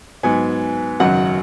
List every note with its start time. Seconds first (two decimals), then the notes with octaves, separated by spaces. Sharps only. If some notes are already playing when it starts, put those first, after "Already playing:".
0.23 G#2 F#3 B3 G#5
1.00 G#1 F#2 C#3 F#3 F#5